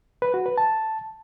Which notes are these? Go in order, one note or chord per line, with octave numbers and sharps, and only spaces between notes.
B4
F#4
B4
A5